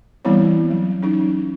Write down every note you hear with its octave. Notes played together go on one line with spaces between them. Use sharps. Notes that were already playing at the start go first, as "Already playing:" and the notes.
E3 G3 B3 C4 E4 C#5
F#3
C#4 D#4